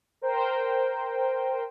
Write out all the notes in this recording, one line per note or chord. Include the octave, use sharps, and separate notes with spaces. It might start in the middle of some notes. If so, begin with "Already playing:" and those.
A#4 C5 G5